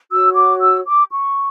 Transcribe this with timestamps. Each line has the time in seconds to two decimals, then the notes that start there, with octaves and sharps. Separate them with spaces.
0.11 F#4 C#5 E6
0.36 D6
0.61 E6
0.86 D6
1.11 C#6